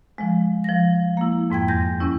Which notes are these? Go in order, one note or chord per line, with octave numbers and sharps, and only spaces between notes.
F3 G#3
F3 A#6
A#3 E4
F2 G#2 G5 G#6
E2 G6 A#6
E2 C#4 E4